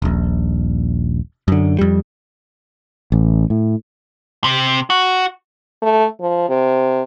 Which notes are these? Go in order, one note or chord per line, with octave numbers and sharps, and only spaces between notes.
D#1 A#1
F#2 D3
F2 G3
A1
A2
C3
F#4
A3
F3
C3